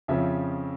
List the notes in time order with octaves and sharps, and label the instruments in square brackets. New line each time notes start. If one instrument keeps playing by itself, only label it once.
[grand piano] F2 C#3 F3 C#4 E5